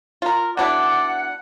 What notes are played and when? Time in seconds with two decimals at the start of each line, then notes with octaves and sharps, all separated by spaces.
0.22 F4 A#4
0.57 B2 D4 E4 D5 F#5